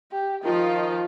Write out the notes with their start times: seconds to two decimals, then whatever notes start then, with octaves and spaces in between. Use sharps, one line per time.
0.12 G4
0.44 D#3 F3 F4 D#5